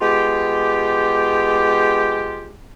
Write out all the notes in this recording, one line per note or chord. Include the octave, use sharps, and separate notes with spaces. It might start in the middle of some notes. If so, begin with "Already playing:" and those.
G#3 B3 F4 G4